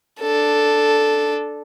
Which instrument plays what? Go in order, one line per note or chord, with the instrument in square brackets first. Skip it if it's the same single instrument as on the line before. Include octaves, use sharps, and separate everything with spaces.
[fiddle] D4 A4